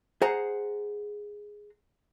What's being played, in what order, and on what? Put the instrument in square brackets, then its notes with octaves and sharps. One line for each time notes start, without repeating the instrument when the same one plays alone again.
[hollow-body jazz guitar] G#4 C5 F#5 A#5